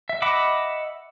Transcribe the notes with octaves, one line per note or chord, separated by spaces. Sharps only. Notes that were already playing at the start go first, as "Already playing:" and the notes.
E5
D#5 E5 F#5 B5 D6